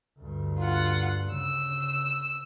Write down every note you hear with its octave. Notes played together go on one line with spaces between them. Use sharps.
D2 G2
F4 F#5
C#3 E6